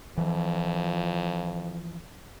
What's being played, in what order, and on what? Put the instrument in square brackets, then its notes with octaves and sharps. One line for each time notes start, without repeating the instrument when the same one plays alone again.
[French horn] F2 [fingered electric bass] E3 F3